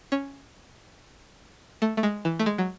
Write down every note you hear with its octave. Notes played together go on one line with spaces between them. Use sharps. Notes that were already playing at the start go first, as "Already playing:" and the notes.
C#4
A3
A3
G#3
E3
A3
G#3
F#3